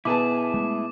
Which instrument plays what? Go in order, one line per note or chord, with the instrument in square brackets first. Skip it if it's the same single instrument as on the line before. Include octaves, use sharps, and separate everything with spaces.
[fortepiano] B2 B4 A5 [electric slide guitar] E4 G#4 [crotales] D6
[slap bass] G#3 A3